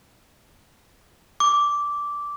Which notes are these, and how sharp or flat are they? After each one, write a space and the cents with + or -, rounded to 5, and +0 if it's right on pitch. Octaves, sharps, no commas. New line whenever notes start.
D6 -10